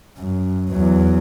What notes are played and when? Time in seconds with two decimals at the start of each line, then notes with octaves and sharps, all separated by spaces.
0.18 F#2
0.71 E2 F#3